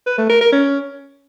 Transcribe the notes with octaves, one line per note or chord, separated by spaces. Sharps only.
B4
A3
A#4
A#4
C#4